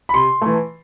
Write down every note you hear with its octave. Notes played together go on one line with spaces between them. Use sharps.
B5
C3 C6
E3 A3